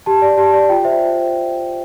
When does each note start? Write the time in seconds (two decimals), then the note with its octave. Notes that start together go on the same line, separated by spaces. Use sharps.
0.06 G4 A5
0.22 D5
0.37 G4 A5
0.54 D5
0.69 F4 G5
0.84 C5 E5